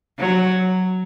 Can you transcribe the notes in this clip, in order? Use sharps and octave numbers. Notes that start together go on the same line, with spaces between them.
F#3